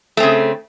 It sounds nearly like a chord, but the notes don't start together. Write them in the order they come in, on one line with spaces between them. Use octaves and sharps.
A3 C4 C#3